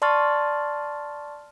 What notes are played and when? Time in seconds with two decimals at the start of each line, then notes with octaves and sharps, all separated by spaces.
0.02 D5 A5 C6 C#6 F6 A6